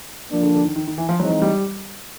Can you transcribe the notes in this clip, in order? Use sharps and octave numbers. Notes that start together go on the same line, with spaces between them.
F3 A#3 D4
D3
D3
D#3
D#3
D#3
E3
F3
E3 F#3 G#3 C4 D#4
G3